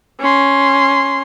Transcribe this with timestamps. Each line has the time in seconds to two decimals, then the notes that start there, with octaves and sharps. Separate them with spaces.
0.20 C#4 C6